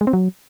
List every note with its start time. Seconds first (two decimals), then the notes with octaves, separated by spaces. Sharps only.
0.01 G#3
0.07 C4
0.13 F#3